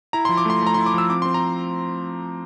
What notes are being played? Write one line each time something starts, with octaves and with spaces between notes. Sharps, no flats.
E4 A#5
F3 C6
D6
A3 C6
A3 A#5
E4 C6
D6
F3 E6
C4 D6
C4 C6
A#5